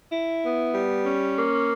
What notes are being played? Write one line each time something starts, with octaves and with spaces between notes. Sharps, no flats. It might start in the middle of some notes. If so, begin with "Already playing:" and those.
E4
B3
G3
C#4
A#3